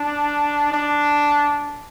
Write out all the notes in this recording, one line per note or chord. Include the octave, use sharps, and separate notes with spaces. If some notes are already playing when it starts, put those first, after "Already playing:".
Already playing: D4
D4